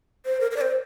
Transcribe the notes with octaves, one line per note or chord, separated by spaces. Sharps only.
C5
A#4
A#4
D5
C5